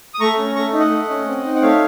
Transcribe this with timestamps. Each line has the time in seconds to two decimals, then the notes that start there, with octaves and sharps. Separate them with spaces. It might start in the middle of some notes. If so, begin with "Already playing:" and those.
0.14 D#6
0.20 A3 A#5 C#6
0.38 C#4
0.56 A3 A#5 C#6
0.73 D#4
0.79 D#5 F#5
0.91 A3
1.09 C#4
1.27 C4
1.44 D#4
1.55 F#5
1.62 A3 C#5 F5